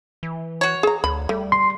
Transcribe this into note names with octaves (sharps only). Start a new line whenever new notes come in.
E3
F#4 C#5
G#4 A#5
D2 B5
G3 A3
C6